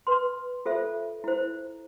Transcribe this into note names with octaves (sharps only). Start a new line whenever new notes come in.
B4 C6
F4 A4 C5 E5
E4 C5